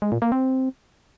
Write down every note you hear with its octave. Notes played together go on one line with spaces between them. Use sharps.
G#3
A#2
A#3
C4